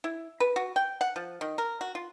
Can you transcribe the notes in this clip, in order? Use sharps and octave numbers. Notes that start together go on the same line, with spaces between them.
E4
B4
F#4
G5
F#5
F3
D#3
A#4
F#4
F4